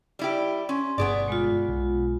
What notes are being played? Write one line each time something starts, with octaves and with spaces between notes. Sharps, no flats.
G3 E4 G4
C#4 C6
G1 G2 B2 B3 G#4 D5
G#3 F4
B1